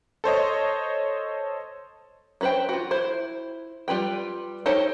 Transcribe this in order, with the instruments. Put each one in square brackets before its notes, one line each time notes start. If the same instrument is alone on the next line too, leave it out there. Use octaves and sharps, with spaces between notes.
[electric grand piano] A4 C5 C#5 D#5
[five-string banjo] C#4 D#4 B4 C5 G5
F4 F#4
E4 C5
G3 F4 B4 G5
D#4 G4 A4 C5 C#5